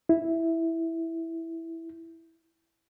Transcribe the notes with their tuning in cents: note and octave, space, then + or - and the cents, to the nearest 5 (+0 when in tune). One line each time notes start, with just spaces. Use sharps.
E4 -5